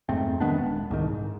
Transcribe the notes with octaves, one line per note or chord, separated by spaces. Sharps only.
F2 G#2 A3 C4
D#3 G#3 B3 D4
D#1
C2 G#2 D#3
G#2